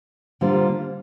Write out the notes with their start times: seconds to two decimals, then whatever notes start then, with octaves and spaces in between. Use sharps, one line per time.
0.41 D3 G3 A#3 F4 C5